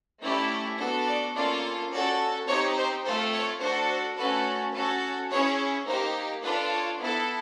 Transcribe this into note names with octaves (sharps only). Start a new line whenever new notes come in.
A3 C#4 E4 G4 D5
B3 D4 F#4 A4
D5
A#3 C#4 F4 A4 D5
C#4 F#4 A4 D5
C4 D#4 G4 C#5
C5
A3 C4 F4 A4 C5
C#5
D4 F#4 A4 C5
C5
A3 C#4 F#4 A4 B4
C#4 F#4 A4 B4
C#4 E4 G#4 C#5
A#3 D#4 G4 C5
D4 F4 A4 B4
C#5
B3 E4 A4